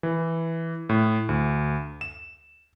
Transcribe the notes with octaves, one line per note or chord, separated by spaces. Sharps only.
E3
A2
D2
E7